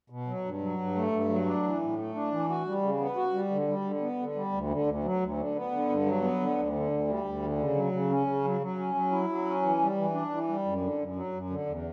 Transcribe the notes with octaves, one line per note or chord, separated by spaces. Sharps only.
B2
F#3
G2
F#3
G2
A3
G2
F#3
D4
E3
A2
A3
D4
E3
F#4
G3
C#3
B3
F#4
G3
D3
G3
D3
B3
D3
G3
D2
D3
D2
F#3
D2
D3
B3
D3
G2
F#3
B3
D3
D2
D3
D2
G3
D2
D3
C#3
F#3
C#3
C#4
C#3
F#3
F#3
C#4
F#3
E4
F#3
C#4
E3
G3
E3
D4
E3
G3
F#2
D3
F#2
F#3
F#2
D3
E2